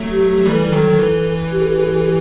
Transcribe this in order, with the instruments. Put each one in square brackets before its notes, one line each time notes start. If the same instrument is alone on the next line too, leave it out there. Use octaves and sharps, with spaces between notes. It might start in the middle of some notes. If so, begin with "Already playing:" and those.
Already playing: [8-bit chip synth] F#3 A3
[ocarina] G4
G4
[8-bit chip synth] F#3
[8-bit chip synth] E3 G3 [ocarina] A4
[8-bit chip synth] E3
[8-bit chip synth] D#3 F#3 [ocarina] A4
[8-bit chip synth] D#3
E3
[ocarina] G4
A4
G4
A4
G4
A4
G4